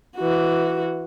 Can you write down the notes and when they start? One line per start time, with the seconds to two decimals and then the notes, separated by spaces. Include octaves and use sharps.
0.17 E3 F#4